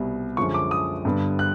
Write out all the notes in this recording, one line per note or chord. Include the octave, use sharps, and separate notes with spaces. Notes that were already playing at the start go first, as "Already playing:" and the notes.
Already playing: C2 B2 G3
F#2 D3 F3 G#3 C#6
D6
D#6
G2 D3 G3 B3
F#6